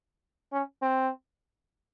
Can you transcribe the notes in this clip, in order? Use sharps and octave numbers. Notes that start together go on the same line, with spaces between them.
C#4
C4